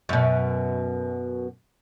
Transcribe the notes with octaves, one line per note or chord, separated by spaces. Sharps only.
F#2 B2